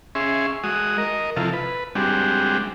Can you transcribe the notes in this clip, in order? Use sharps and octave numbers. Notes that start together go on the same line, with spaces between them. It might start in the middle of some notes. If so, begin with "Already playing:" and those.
C#4 G#4 E5 C6
G#3 F#4 D#6
A#4 D#5
C3 F3 E4 F4 A4
B4
G3 G#3 C4 D4 F#4 G4